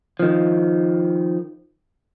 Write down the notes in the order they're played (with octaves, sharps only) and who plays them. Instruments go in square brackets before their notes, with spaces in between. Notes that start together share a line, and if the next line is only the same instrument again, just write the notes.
[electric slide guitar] D#3 F3